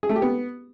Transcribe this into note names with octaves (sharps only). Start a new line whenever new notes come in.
G#4
A3
G4
B3